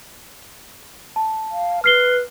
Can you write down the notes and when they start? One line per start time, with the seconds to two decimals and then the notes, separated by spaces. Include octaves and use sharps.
1.16 A5
1.51 F5
1.84 B4 F6 C7 G7